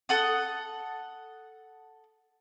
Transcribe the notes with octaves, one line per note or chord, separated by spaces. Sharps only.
A4 F#5 D#6